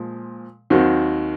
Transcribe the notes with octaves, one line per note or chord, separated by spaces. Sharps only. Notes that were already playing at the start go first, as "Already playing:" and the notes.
Already playing: A#2 F3 G#3
D#2 D#3 F#3 C4 F#4